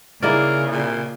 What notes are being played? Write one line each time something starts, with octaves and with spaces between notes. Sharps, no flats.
C#3 A#3 D#4 E4 G#4 A#4 D5
A#2